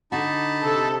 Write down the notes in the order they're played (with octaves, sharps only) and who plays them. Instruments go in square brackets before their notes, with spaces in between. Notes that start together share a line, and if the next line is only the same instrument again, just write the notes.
[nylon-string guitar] D3 F#4 [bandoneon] D#4 A5 B5
[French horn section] C3 [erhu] A4